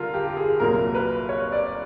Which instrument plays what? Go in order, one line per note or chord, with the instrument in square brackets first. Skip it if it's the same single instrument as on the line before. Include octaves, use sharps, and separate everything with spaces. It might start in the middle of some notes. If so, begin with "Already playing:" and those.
Already playing: [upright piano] G2 D3 F4 A#4
G4
G#4
C2 A#2 F#3 A#4
B4
C#5
D5